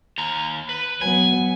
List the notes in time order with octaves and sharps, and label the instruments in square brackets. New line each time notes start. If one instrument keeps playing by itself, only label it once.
[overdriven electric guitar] D#2 A#5
B4
[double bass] F#3 B3 [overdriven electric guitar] G#5